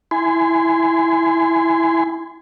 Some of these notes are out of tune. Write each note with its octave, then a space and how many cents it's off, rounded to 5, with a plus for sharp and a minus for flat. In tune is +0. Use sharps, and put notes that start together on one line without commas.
E4 +0 G#5 +0 C6 -35